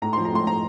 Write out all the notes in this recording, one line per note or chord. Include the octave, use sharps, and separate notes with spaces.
A2 A#5
F3 C6
A#5
A2 C6
F3 A#5